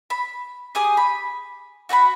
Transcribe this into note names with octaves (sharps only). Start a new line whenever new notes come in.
B5
G4 G#4 G#5 D#6
B5
F#4 F#5 G5 B5